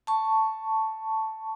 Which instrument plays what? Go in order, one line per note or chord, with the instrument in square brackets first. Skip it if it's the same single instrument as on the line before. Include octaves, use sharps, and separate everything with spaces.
[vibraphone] A5 C#6